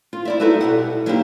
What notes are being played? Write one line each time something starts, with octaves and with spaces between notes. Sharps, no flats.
F4
E4 D5 E5
B3 D#4 E4 F#4 A4 B4
B2 G4 F#5
F#3 A#3 B3 D#4 E4 G4